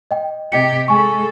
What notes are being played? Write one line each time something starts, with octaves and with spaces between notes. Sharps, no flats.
D#5 G5
C3 G4 D#5 G5 C#7
G#3 A4 G#5 C#6